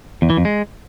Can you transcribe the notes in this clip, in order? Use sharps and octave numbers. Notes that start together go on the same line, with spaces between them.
E2
E3
F2
G#3